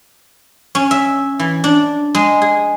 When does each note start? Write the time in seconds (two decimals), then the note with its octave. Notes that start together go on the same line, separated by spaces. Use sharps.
0.75 C#4
0.91 E5
1.39 E3
1.64 D4
2.15 G#3
2.42 G#4